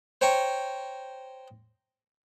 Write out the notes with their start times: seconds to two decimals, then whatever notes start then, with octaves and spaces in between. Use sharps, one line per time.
0.21 C5 C#5 G5 A#5 C#6